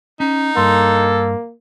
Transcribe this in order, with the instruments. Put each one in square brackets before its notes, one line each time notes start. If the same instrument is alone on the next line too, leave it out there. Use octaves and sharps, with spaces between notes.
[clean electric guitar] C#4 [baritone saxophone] D#4
[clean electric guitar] G2 C6 [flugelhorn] A#3 [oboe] A4